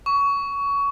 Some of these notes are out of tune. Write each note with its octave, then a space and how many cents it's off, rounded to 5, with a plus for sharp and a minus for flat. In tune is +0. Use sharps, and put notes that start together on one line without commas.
C#6 +20